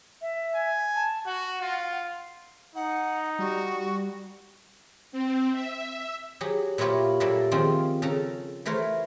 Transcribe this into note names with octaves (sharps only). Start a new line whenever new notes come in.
E5
G#5
A5
F#4 F#5
F4
D#4 F#5
G3 F#4
C4
E5
F#3 G4 G#4
A#2 F#3 E4 F4 G4 C#5
A#2 F#3 G3 D4 A4 E5
D#3 F3 C4 C#4 F4 G#4
C#3 A4 A5 A#5
E3 A3 A#4 C5 C#5